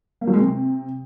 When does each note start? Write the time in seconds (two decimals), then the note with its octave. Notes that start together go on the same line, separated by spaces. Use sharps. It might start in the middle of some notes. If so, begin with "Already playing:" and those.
0.21 A#3
0.27 F#3
0.34 G#3
0.40 C3